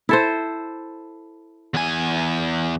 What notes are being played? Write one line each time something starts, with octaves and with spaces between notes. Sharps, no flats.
E4 A4 C5
E2 G#5